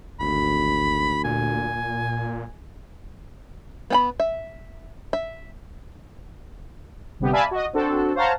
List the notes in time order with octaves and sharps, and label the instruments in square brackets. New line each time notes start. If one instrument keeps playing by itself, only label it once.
[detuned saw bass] G#1 [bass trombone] D2 [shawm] B5
[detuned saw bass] A#2 [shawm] G#5
[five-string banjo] B3 G5 B5
E5
E5
[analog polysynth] G1 C3 G3 B3 G4
D5 E5 F5 G#5 A5 B5
F#4 D#5
C4 D4 F#4 A4
C5 C#5 F5 F#5 A5 A#5